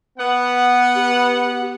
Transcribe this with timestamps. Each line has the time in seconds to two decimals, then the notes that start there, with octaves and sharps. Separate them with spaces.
0.18 B3 F#5
0.95 G4